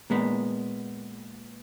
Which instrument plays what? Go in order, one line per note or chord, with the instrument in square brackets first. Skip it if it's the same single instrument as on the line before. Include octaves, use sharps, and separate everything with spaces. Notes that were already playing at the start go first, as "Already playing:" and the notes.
[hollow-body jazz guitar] A#2 G#3 B3